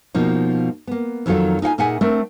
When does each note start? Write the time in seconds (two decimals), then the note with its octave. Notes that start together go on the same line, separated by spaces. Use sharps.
0.14 B2 F3 A#3 D#4
0.87 A#3 B3
1.26 F2 D#3 F#3 F4 A4
1.62 D#4 F4 F#5 G#5
1.78 A#2 D#4 G#4 E5 F#5 G#5
2.01 A3 C4 D4 A#4